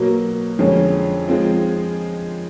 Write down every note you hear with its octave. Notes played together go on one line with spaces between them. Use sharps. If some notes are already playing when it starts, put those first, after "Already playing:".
Already playing: B2 F#3 A#3
F2 D3 F3 G#3 C#4
F3 G#3 C4 F4